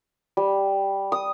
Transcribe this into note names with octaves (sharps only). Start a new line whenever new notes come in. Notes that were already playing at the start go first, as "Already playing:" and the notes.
G3
D#6